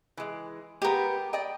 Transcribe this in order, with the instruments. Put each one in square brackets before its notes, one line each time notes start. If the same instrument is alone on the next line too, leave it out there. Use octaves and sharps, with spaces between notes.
[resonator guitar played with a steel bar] E3 G#3
[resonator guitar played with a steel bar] G#3 B3 [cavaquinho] G4 A#4
[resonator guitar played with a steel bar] D5 D#5 G5